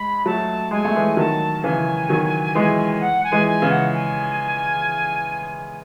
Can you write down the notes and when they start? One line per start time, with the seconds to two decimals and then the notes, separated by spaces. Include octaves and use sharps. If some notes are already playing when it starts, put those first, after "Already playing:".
Already playing: G#3 B5
0.25 F#3 A3 A5
0.71 G#3 G#5
0.85 A3
0.96 E3 G#3
1.17 D#3 F#3 A5
1.63 C#3 E3 G#5
2.09 D#3 F#3
2.55 E3 G#3
3.01 F#5
3.24 G#5
3.32 E3 G#3
3.47 G#5
3.62 C#3 E3
3.70 F#5
3.93 G#5